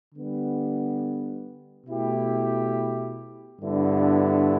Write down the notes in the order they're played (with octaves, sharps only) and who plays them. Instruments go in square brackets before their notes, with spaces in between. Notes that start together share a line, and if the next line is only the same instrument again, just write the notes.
[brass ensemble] D3 G3 B3
B2 A3 E4 G4
G2 D3 B3 E4